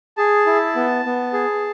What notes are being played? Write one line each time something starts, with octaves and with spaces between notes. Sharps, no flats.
G#4 A5
E4
B3
B3
G#4